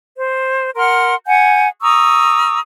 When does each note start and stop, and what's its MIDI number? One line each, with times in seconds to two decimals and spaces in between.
0.17 0.70 72
0.75 1.13 70
0.75 1.13 78
0.75 1.13 84
0.75 1.13 89
1.27 1.68 78
1.27 1.68 80
1.27 1.68 91
1.82 2.59 82
1.82 2.59 85
1.82 2.59 87
1.82 2.59 88